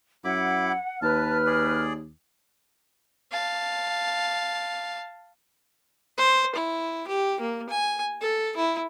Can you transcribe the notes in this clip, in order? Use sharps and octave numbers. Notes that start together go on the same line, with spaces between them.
F#2 E4 F#5 B5 D6
D#2 B4 A5 F6
G#4 D5
F5 A5
C5
E4
G4
A#3
G#5
A4
E4